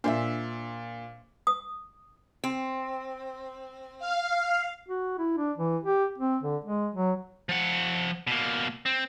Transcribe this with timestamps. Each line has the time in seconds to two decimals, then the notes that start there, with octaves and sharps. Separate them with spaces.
0.04 A#2 D4 C5 D5 E5
1.47 D#6
2.44 C4
3.99 F5
4.88 F#4
5.19 E4
5.37 D4
5.58 E3
5.84 G4
6.19 C4
6.43 D3
6.65 G#3
6.94 F#3
7.49 F3 F#5
8.27 B2 A#3
8.86 C4